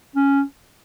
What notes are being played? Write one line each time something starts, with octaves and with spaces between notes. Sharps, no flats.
C#4